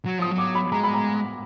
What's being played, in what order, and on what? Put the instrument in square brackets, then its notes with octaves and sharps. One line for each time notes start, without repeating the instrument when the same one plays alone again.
[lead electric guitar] F#3
[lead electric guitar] F3 [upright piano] D#6
[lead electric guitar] F#3
[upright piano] D6
B5
[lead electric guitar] G#3 [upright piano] A#5
[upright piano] B5
A#5